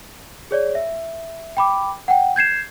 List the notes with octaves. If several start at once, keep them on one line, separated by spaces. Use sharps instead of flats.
G#4 C#5 D5
E5
G5 B5 D6
F#5 G5
G6 G#6 C7 E7